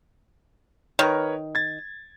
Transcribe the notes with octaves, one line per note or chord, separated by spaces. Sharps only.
D#3 A#4 B4 C#5
G#6 A6